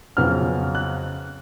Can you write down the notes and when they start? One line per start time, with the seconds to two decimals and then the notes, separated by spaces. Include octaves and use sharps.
0.17 F2 C#3 F#3 B3 F6
0.75 F#6